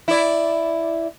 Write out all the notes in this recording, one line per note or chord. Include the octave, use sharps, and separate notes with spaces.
E4 D5